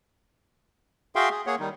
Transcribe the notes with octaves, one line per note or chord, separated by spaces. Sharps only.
F#4 G#4 E5 F5 G5 C6
G#4
A#3 G#4 C#5 F#5
D#3 G3 D#4